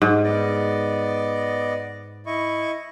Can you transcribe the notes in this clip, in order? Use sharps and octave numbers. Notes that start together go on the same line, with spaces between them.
G#2
B3 D5 D#5
E4 D#5 C#6